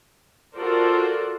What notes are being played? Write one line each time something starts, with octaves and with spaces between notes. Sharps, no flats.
F4 F#4 A4 A#4 C5 D5